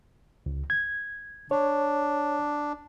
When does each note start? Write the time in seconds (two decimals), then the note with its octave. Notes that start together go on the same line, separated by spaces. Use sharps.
0.46 C#2
0.70 G#6
1.51 D4 C#5